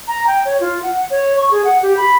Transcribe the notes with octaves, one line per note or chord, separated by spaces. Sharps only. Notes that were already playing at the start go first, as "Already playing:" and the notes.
A#5
G5
C#5
F4
F#5
C#5
C#6
G#4
F#5
G4
B5